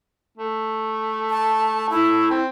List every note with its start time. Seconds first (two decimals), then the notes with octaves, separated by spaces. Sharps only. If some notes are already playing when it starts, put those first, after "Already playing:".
0.38 A3
1.30 A5
1.90 E4
2.31 C4